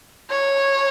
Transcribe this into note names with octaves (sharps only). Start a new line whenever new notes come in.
C#5